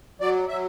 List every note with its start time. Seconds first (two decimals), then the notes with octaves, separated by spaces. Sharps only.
0.20 F#3 D5
0.48 F#3 E5